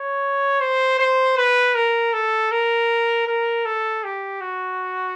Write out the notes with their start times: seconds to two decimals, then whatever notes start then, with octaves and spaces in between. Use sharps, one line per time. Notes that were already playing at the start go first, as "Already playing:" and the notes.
Already playing: C#5
0.60 C5
0.99 C5
1.37 B4
1.75 A#4
2.13 A4
2.51 A#4
3.27 A#4
3.65 A4
4.04 G4
4.41 F#4